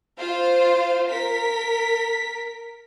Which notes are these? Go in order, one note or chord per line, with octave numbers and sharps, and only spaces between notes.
F4 C5 F5
A#4 B6